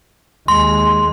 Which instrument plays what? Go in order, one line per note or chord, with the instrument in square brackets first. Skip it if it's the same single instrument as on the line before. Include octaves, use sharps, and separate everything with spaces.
[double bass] D#2 G#3 [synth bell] C6